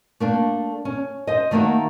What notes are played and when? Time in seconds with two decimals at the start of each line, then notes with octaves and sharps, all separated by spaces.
0.20 A3 A#3 D4
0.85 C#4
1.27 C5 D#5
1.51 D#3 A3 A#3 D#4 F#4